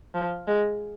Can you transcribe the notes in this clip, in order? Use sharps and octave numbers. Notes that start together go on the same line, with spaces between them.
F3
G#3